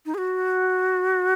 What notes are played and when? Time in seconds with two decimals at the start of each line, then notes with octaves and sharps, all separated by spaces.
0.06 D#4
0.14 G#4
0.18 F#4